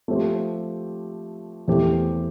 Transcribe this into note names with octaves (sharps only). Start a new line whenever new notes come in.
F3 A3 C4 G4 C5
E2 E3 A3 C4 G4